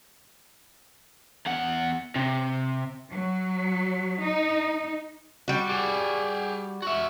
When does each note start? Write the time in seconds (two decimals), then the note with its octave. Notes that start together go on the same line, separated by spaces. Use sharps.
1.47 E2 F#5
2.16 C3
3.11 F#3
4.22 D#4
5.48 G3 F#4
5.69 G4 G#4
6.82 F#4 E5